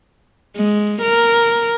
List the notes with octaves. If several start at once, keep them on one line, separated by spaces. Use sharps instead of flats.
G#3
A#4